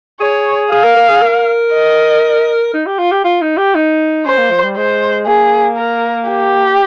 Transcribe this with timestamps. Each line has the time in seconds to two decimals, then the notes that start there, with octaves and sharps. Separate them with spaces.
0.20 G#4 C#5
0.72 G#4 F5
0.84 A#4
0.97 A#4
1.09 G#4
1.22 A#4
1.73 D#5
2.74 D#4
2.86 G4
2.99 F4
3.12 G4
3.24 F4
3.41 D#4
3.58 G4
3.75 D#4
4.26 C#4 C5
4.38 A#3
4.51 F3
4.64 G3
4.76 G#3 C5
5.26 A#3 G#4
5.77 A#4
6.28 G4